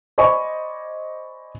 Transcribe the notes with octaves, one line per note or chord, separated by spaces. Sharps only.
C5 D5 D#5 G#5 B5 C#6